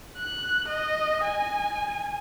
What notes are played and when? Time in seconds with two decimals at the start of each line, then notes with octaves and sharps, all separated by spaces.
0.18 F#6
0.69 D#5
1.24 G#5